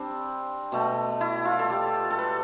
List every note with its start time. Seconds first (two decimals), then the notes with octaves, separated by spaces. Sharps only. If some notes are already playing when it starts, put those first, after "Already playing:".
Already playing: G3 C4 D4
0.72 B2 A3
1.21 E4
1.45 F4
1.59 A4
1.70 G4
2.11 A4
2.19 B4